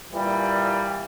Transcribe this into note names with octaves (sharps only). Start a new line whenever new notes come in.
A#2 E3 G3